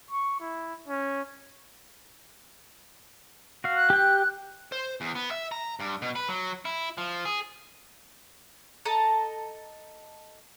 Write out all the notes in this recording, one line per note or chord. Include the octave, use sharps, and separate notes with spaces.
C#6
E4
C#4
F#4 F5
F#6
G4 G5
C5
E2
B3
E5
A#5
G2
B2
B4
F#3
E4
F3
G#4
A4 D#5 A5 A#5